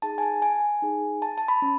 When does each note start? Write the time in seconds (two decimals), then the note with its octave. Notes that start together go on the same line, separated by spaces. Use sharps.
0.02 D#4 G#4 A5
0.18 G#5
0.22 A5
0.42 G#5
0.82 D#4 G#4
1.22 A5
1.38 A5
1.48 B5
1.62 C#4